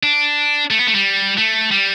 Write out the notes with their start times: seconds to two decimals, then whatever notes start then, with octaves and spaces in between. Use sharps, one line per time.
0.03 D4
0.70 A3
0.79 B3
0.87 A3
0.95 G3
1.38 A3
1.71 G3